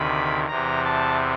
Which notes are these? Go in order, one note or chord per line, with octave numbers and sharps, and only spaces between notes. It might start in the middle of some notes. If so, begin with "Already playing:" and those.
Already playing: D2 C3 D#3 B5
E2 C3 E3 A#5
A5